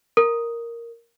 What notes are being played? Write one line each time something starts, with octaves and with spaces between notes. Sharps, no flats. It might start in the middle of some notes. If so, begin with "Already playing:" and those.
A#4